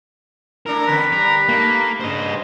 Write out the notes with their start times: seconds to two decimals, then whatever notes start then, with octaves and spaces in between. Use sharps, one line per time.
0.66 A3 D4 E4 A#4
0.87 E2 D3 C#4 B4
1.12 G3 A#4
1.49 A3 A#3 D#4
2.00 G2 C#3 C5 D#5